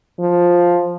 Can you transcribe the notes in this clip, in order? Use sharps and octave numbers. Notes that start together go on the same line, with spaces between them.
F3